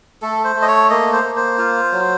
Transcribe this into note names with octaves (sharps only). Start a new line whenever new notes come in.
A3 A4
C5
A3
D#5
C#5
A#3 D#5
C5
A#3
C5
F4
F#3